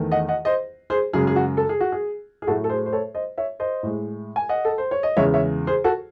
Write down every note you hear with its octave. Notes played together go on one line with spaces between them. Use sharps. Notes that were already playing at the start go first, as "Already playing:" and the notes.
Already playing: E2 D#3 A3
D#5 F#5
D#5 F#5
C5 D#5
G#4 C5
F#2 C#3 G#3 G#4
G#4
F#4
A4
G#4
F#4
G#4
G#4
A2 F#3 A3 F#4 A4
A4
G#4 C5
C5
A4 C#5
C5 D#5
C#5 E5
C5 D#5
A2 G#3
G#5
D#5 F#5
A4
C5
C#5
D#5
E2 C#3 G#3 C#5 E5
C#5 E5
G#4 C5
F#4 A4